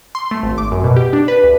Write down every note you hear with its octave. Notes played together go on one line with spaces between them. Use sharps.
C6
A3
G#1
D6
F#2
B2
G4
D4
B4
D2